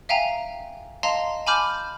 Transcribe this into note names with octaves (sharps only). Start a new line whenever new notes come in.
E5 F5 G5 G#5 A#5
D#5 F5 A5 A#5 C6
G#5 A5 B5 D6 F6 G6